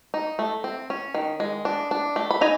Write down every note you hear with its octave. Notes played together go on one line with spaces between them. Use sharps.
D#4
A3
C4
C#4
D#3
G#3
D4
D4
A3
B5
D#4 G#5 A#5